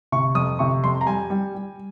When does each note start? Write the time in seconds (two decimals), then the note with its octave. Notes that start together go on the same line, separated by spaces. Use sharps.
0.12 C3 C#6
0.35 F2 D#6
0.59 C3 C#6
0.84 F2 C6
1.01 A#5
1.06 G3 G#5
1.30 G3
1.55 G3